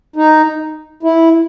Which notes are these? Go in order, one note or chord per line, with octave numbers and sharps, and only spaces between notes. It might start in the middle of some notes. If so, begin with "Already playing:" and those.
D#4
E4